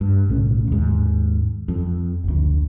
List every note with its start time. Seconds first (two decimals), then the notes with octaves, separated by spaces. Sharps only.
0.01 G2
0.29 B1 A2 C#3
0.68 D#2 G#2
1.68 F2
2.24 F#1 D2